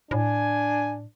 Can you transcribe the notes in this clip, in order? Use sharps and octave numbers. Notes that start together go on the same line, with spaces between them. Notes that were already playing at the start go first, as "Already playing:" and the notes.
A2 D4 G#5